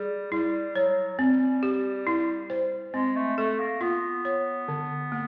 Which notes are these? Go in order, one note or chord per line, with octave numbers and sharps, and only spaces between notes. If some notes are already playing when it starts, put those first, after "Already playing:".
Already playing: G3 G#4
G3 E4
F#3 C#5
G3 C4
G4
E4
C5
G#3 C4
A3
A3 A4
A#3
B3 F4
C#5
D3
A#3